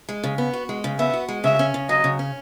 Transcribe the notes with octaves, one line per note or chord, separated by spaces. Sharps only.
G#3
C#3
B3
F#4
G#3
C#3
B3 E5
F#4
G#3
C#3 E5
C#4
C#3
F#3 D#5
C#3
C#4